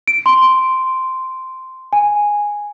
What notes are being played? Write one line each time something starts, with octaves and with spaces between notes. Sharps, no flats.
D7
C6
G#5